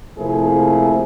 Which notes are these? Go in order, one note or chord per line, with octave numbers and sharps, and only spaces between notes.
C3 F3 A3 A#3 E4 G#4